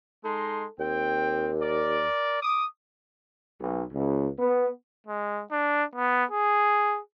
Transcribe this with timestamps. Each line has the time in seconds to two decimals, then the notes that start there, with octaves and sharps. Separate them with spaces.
0.24 G#3 D#4 A4 C6
0.79 D#2 C4 G5
1.61 A#4 D5
2.42 D6 D#6
3.61 B1
3.93 C#2
4.38 B3
5.07 G#3
5.51 D4
5.95 B3
6.31 G#4